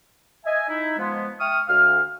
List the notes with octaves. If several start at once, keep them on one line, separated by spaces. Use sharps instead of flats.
D#5 E5 G#5
D#4 E4
F3 G#3 B3
E5 G5 C#6 D#6 F6
D2 F5 F6